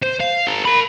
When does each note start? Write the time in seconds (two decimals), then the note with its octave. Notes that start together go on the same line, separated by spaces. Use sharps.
0.03 C5
0.21 F5
0.47 G#4 A#4
0.65 A#4 B5